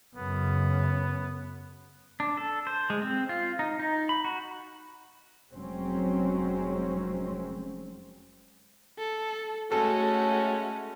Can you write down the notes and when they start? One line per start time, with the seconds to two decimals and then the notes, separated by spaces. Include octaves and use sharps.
0.15 F#2 C#3 B3
2.20 D4
2.37 A4
2.67 C5
2.90 G#3
3.02 C4
3.29 F4
3.59 D#4
3.79 D#4
4.09 B5
4.25 F#4
5.52 F1 F#3 G#3 C4 C#4
8.98 A4
9.72 G#3 A3 C#4 F#4 A4